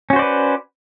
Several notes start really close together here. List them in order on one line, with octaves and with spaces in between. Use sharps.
C#4 F#4 C5 D5 B4